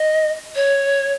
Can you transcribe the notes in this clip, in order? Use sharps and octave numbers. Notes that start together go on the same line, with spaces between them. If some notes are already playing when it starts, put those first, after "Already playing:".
Already playing: D#5
C#5